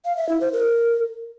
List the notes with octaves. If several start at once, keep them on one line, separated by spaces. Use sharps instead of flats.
F5
E5
E4
C5
A#4